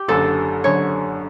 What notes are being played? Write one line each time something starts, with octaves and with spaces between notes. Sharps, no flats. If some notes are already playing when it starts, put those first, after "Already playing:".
Already playing: G4
F#1 F#2 D3 A4
F#1 F#2 D3 C#5